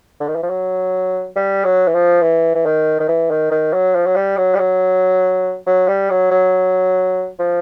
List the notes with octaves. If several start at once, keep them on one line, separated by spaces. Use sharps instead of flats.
D3
D#3
E3
F3
F#3
G3
F#3
E3
F3
E3
E3
D#3
D#3
E3
D#3
D#3
F#3
F3
F#3
G3
F#3
G3
F#3
F#3
G3
F#3
F#3
F3